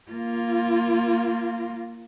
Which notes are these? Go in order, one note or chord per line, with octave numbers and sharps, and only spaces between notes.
A#3 F4